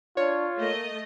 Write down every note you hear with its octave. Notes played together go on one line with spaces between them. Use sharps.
D4 F4 C#5
A3 A#3 D#5